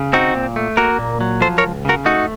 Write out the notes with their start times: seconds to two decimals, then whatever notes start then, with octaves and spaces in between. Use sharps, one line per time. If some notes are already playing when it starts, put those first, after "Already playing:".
Already playing: C#3
0.13 C4 D#4 F#4
0.35 A#2
0.56 A3
0.77 A#3 F#4 A#4
0.99 A#2
1.21 F#3
1.41 F3 A4 C5
1.58 A#4 C#5
1.63 C#2
1.85 C#3 F#4 A#4
2.05 A3 D#4 F#4